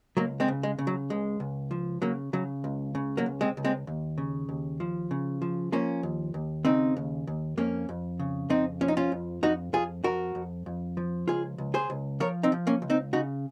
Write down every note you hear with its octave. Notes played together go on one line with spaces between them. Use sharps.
C#2 F#3 A#3
G#3 C4
C#3
G#3
C#3
F#3
C#2 G#3
C#2
F3
C#3 F#3 A#3
C#3 F#3
C#2
C#3
F#3 A#3
C#2
G#3 C4
C#2
G#3 C4
D#2
C#3
D#2
F3
C#3
F3
F3 A#3 C#4
D#2
D#2
C#3 C4 D#4
D#2
D#2
F2 A#3 C#4
F2
C#3
F2 C4 D#4
F3 C#4
D#4
C#4 F4
F2
F2 D#4 F#4
F2 F4 G#4
F2 F#4 A#4
F2
F2
F3
C#2 F4 G#4
C#2
G#4 C5
C#2
F3 A#4 C#5
C4 D#4
F3
A#3 C#4
C#2
C4 D#4
C#3 D#4 F#4